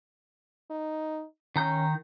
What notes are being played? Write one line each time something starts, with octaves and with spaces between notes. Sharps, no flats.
D#4
D#3 C#4 A#5 G6